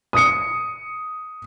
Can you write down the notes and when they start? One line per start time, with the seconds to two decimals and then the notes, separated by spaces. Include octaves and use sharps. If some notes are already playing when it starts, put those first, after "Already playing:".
0.13 D#6 C#7